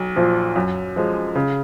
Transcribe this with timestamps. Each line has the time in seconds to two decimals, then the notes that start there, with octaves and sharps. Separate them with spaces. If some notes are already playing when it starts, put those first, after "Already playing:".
Already playing: B1
0.16 A#2 F3
0.56 F#2
0.96 F3 G#3
1.35 C#3